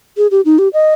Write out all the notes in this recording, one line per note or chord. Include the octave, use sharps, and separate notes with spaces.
G#4
G4
D#4
G4
D#5